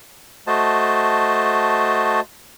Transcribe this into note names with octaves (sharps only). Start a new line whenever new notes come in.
A3 F#4 C5 D#5 A5